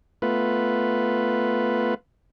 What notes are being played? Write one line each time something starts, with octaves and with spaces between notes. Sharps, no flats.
A3 B3 F4 B4